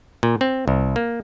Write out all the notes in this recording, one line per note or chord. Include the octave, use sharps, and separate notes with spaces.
A#2
C4
C2
A#3